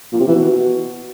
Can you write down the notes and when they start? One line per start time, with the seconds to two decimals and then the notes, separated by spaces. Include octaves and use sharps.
0.13 A#2
0.20 C3
0.28 E3
0.36 B2